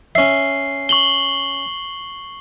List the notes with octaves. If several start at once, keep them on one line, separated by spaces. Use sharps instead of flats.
C#4 E5 C7
C#6 F#7 G7